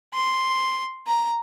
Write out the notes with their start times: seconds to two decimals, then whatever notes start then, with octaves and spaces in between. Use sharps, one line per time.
0.13 C6
1.07 A#5